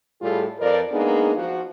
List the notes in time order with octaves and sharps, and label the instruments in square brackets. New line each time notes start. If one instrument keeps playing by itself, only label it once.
[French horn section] A2 G3 F4 G#4 A4
F2 F3 A#4 B4 D5
G#3 A#3 B3 D4 D#4 G#4
F3 F#4